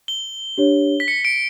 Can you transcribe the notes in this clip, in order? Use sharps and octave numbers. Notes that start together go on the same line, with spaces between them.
G7
D4 G4 C#5
B6
C#7
D7